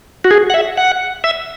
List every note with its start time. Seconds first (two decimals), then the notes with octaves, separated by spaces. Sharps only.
0.25 F#4
0.31 G#4
0.50 F#5
0.54 E5
0.77 F#5
1.24 E5